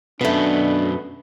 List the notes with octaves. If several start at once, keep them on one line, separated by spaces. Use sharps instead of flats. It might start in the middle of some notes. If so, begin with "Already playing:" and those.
F#2 B2 A3 B3 D4